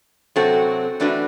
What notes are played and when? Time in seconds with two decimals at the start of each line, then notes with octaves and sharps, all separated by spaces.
0.36 C3 F#3 C4 F#4 A4
1.00 E3 A3 D4 F#4 B4